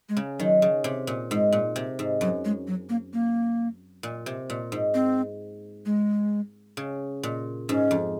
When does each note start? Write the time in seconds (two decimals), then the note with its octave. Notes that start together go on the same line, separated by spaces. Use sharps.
0.09 G#3
0.17 C#3
0.39 D#3 F#3
0.62 C#3
0.84 C3
1.07 A#2
1.31 G#2 G#3
1.53 A#2
1.76 C3
1.99 G#2
2.21 F#2 F#3
2.45 G#3
2.67 F#3
2.89 A#3
3.13 A#3
4.03 A#2
4.26 C3
4.50 A#2
4.72 G#2
4.94 C4
5.86 G#3
6.77 C#3
7.23 A#2
7.69 G#2 C#4
7.91 F2